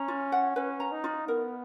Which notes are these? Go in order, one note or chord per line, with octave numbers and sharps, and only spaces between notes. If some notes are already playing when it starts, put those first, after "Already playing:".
Already playing: C#4 A#5
F4
F#5
C#4 B4
A#5
D#4
F4
B3 A#4